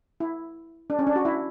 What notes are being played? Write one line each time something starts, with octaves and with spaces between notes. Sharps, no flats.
E4
D4
C#4
D4
F#4
E4